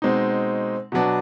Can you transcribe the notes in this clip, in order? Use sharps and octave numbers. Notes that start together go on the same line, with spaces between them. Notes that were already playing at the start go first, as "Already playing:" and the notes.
B2 G#3 C4 D#4
B2 F#3 B3 D4